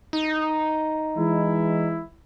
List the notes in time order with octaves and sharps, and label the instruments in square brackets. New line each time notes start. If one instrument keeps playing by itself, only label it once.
[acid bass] D#4
[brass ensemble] E3 G#3 E4